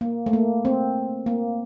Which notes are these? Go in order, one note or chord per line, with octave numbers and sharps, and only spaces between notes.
A#3
A3
A#3
C4
A#3